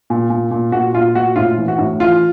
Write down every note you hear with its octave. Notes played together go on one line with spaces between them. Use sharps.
A#2
A#2
A#2
A#2 F#4
A#2 F4
A#2 F#4
A2 F4
E3
F#4
A2
E3 F4